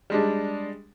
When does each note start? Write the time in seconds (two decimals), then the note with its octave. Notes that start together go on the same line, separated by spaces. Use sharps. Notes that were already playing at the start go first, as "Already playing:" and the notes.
0.10 G3 G#3 D4